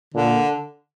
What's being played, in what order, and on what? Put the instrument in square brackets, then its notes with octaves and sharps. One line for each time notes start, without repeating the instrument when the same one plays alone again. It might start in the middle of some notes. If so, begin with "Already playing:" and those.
[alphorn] A#2 [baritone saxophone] D3